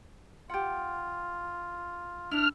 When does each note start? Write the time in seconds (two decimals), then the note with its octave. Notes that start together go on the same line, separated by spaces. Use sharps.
0.50 F4 G4 F#5
2.31 D4 E4 F6